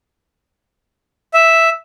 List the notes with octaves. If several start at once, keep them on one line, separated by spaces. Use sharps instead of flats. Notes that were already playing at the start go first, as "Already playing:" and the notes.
E5